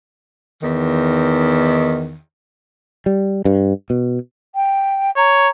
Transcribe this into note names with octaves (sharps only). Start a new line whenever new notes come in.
E2 D#3
G3
G2
B2
G5
C#5 A#5